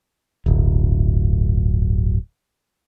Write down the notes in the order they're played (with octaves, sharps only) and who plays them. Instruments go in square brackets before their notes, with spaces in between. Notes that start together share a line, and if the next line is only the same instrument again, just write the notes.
[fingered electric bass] D1 G1